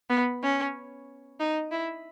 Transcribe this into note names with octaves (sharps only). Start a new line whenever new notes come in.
B3
C#4
D#4
E4